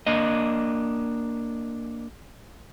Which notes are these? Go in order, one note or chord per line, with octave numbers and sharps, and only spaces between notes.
A#3 D4 D#5